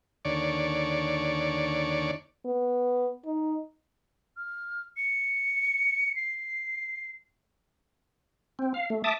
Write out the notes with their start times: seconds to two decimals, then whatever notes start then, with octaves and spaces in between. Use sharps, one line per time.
0.25 D#2 D3 C#5 D5
2.45 B3
3.25 D#4
4.37 F6
4.97 C#7
6.16 C7
8.59 C4
8.74 F5
8.90 A3
9.04 E5 A5 D6 D#6